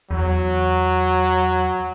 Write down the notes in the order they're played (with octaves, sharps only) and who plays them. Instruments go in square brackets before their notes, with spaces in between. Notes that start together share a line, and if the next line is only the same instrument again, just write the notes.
[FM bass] E2 [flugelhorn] F#3